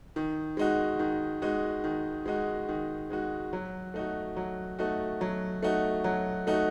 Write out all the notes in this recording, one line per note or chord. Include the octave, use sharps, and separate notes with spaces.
D#3
G#3 D#4 F#4
D#3
G#3 D#4 F#4
D#3
G#3 D#4 F#4
D#3
G#3 D#4 F#4
F#3
A3 D#4 F#4
F#3
A3 D#4 F#4
F#3
A3 D#4 F#4
F#3
A3 D#4 F#4